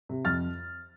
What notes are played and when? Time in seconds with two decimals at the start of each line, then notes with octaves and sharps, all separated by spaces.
0.09 C3
0.25 F2 F6 A6